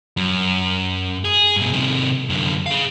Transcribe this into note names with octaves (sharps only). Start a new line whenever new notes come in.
F#2
G#4
G2 B2
C3 D#3
F#2 D3
G#4 F5